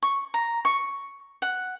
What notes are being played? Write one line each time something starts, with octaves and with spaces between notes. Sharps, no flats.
C#6
A#5
C#6
F#5